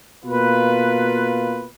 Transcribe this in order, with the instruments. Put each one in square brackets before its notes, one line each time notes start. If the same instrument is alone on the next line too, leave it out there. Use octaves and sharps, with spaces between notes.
[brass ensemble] B2 A#3 F4 B4